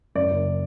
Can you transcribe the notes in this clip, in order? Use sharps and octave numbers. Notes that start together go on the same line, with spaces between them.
F#2 D5
F#1